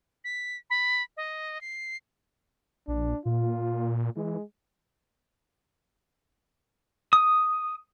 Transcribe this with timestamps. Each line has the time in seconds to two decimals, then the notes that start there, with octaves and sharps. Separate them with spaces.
0.24 B6
0.70 B5
1.17 D#5
1.61 C7
2.88 A#1 D4
3.26 A#2 F4
4.17 E3 G#3
7.13 D#6